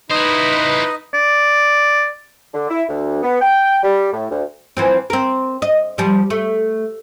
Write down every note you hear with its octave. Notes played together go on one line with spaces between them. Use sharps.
D#4 E4 B4 C5 D#5
D5
D3
E4
D2
B3
G5
G3
A2
D2
E3 F3 C4
C4 A#4
D#5
F3 G3
A3